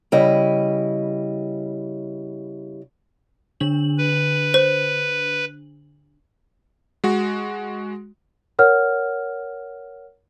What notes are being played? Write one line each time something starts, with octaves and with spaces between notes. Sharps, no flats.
C#3 G3 E4 D#5
D3 D4 F#7
B4
C5
G#3 F#4
A#4 C#5 F#5 F6